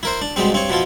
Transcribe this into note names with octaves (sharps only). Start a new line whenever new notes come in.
E4 A#4 C5
D4
B2 G3 G#3 C4
G2 C4 C#5
B2 F3 E4 F4